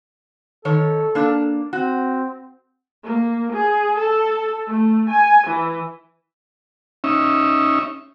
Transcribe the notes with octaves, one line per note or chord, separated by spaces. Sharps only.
D#3 A4 C#5
A#3 D4
C4 F#4
A#3
G#4
A4
A3
G#5
E3
C#4 D#4 E5